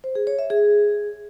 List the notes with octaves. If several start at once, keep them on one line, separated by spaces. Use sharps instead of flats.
C5
G#4
C#5
E5
G#4